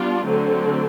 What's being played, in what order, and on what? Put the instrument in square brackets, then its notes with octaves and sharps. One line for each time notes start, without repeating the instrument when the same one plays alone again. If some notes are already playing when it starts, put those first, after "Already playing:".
Already playing: [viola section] G3 B3 D4 F4
D3 F#3 A3 C4